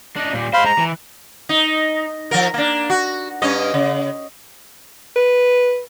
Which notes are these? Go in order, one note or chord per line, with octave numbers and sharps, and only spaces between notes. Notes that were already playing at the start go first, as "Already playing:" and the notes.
D4 D#4
A#2 G3
G#3 C5 F5 B5 C6
A#5
E3
D#4
F3 A#4
A#3 D4
F#4
G2 C#4 D#5
C#3
B4